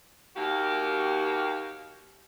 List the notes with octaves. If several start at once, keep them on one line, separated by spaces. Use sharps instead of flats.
D#2 A#3 F#4 G4 F5